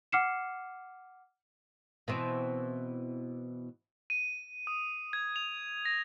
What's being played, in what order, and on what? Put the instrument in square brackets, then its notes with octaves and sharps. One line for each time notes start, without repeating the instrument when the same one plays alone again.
[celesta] F#5 D6 F6 C7 C#7 E7
[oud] B2 E3 C4
[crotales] D#7
D#6
G#6
F7
A#6